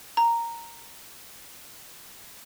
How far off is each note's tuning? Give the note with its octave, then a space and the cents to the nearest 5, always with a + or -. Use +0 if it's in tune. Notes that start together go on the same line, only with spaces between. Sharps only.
A#5 -5